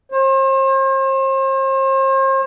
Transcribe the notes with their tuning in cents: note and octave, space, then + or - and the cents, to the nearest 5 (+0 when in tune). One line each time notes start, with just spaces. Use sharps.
C5 +40